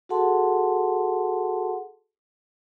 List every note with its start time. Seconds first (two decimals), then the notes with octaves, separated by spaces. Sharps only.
0.09 F#4 G#4 A4 F#5 A5 C6